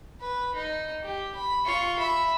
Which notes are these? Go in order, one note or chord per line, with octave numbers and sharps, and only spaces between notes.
B4
D#4
G4
B5
F4 C#6
E5 B5